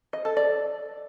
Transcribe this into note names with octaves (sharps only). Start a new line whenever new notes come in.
D#5
A4
D5